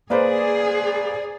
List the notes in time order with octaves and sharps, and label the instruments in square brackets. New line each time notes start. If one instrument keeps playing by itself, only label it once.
[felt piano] A#3 B4 C5 [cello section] G#4 [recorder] D5